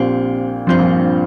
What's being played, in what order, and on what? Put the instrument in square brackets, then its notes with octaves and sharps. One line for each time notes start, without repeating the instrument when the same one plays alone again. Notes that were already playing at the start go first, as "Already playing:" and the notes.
Already playing: [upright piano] A#1 A#2 [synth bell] C4 G4 C5
[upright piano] G2 [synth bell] F3 C4 F4 C5
[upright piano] A#1 A#2